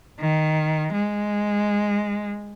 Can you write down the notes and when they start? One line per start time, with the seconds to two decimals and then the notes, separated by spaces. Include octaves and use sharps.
0.19 D#3
0.91 G#3